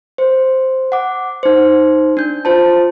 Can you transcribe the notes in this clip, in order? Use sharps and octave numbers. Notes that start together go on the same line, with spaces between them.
C5
F#5 D6
D#4 C5
D4 G6
F4 C5 A5